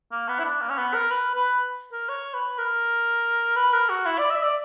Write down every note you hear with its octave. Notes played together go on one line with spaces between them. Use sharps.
A#3
B3
E4
D4
A#3
C#4
B3
A#4
B4
B4
A#4
C#5
B4
A#4
B4
A#4
F#4
E4
D5
E5
D5